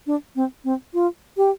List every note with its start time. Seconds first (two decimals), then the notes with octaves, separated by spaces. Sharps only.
0.07 D4
0.36 C4
0.64 C4
0.94 F4
1.37 G4